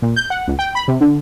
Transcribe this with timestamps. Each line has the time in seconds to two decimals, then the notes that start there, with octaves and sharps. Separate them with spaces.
0.02 A#2
0.16 G6
0.30 F#5
0.48 C#2
0.59 G5
0.75 B5
0.88 C3
1.01 D3